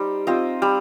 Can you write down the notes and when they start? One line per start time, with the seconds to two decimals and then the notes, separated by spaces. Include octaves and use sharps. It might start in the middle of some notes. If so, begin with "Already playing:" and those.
Already playing: G3 D#4 C5
0.27 C4 F4 D#5
0.62 G3